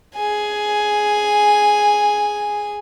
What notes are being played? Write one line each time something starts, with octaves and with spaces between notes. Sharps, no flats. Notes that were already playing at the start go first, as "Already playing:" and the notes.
G#4 G#5